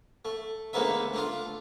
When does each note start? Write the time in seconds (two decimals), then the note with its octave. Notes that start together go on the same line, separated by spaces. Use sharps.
0.25 A3
0.73 D2 G#3 A#3 B3 D#4 E5
1.13 A3 D4 F4